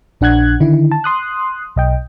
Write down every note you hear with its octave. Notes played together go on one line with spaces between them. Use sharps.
A#1 D4 F#5 F#6 G#6
D3 D#3 E4
A5
C6 D#6 F#6
B1 D#5 G5